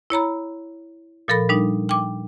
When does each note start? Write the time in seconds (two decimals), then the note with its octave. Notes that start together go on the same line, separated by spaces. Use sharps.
0.10 E4 C#5 A#5 B5
1.28 A#2 F3 A4 A#4 B5
1.49 G3 D4 D#4
1.89 G5 D6